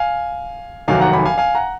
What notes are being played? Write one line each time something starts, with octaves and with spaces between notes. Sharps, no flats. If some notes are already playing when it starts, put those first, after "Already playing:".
Already playing: F5 G#5
F1 D#2 D#3 F#3 F5 G#5
F#5 A#5
G#5 B5
F5 G#5
F5 G#5
F#5 A#5